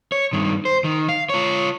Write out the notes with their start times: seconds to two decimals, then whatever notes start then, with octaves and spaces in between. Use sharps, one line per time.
0.12 C#5
0.33 G2 D#3
0.65 C5
0.84 D#3
1.09 F5
1.29 F4 C#5